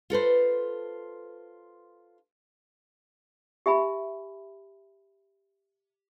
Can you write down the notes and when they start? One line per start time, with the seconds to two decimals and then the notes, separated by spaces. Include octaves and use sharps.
0.10 F4 A4 B4 C5
3.66 G4 E5 G#5 B5